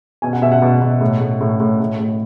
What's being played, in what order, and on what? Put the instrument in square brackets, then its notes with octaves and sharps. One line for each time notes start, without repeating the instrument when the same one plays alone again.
[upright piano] B2 G#5
F#5
B2 E5
F#5
B2
B2
A2
A2
A2
A2
A2
A2